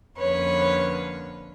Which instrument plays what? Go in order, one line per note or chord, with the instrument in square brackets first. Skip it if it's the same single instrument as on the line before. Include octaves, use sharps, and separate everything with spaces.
[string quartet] F2 D3 F3 A#3 C#4 B4 C#5